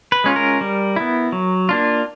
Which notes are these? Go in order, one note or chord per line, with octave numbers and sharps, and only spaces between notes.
B4
G#3 C#4 F4
A#4
G3
B3 E4
F#3
A#3 D4 F4